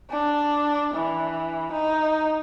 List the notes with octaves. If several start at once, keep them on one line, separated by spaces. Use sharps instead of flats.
D4
E3
D#4